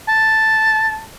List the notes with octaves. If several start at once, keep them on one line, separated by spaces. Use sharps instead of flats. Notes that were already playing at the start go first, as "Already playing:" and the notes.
A5